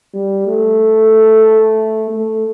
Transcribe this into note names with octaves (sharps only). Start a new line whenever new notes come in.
G3
A3
A3